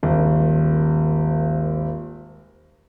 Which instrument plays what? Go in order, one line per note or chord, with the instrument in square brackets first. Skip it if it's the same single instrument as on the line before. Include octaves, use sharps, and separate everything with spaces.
[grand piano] D#1 G#1